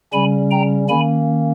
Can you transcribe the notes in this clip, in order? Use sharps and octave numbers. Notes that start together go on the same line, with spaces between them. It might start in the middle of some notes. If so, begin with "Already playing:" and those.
C#3 G3 C#4 G#5 B5
G5 A#5
D#3 A#3 C#4 G#5 B5